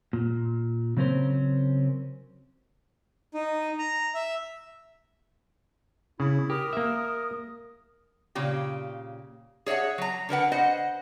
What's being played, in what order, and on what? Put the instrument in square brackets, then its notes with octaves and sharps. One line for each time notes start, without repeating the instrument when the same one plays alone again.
[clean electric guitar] A#2
C#3 F#3 C4 C#4 A#4 C5
[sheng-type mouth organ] D#4
A#5
E5
[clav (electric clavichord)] C#3 [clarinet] E4
[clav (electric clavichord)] G4 [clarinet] A#4 [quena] D#6
[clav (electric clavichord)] A#3 E5
[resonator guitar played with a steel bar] A#2 C#3 G4
G#4 C#5 D5 E5 F#5
F#3 A#5
D3 A#4 B4 F#5
C5 D#5 F#5